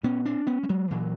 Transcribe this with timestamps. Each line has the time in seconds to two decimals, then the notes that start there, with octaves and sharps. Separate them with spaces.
0.03 A#2 B3 C#4
0.25 C4 D4
0.47 B3 C#4
0.63 G3
0.69 F#3 G#3
0.91 A#2 E3 F#3